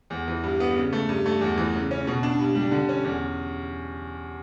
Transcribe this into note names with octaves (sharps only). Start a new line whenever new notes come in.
E2
E3
G2
B3
C#3
A3
G2
A3
E2
E3
C#3
C#4
B2
D4
G2
G3
D3
C#4
E2